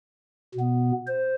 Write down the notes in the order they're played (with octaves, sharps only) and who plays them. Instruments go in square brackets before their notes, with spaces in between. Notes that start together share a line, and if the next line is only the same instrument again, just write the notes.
[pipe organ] B2 B3
C5